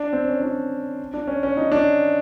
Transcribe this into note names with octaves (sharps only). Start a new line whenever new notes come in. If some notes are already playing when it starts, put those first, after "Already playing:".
Already playing: D4
C4
C#4
D4
D4
C#4
C#4
D#4
D4